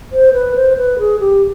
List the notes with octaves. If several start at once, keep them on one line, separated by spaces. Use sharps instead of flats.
C5
B4
C5
B4
G#4
G4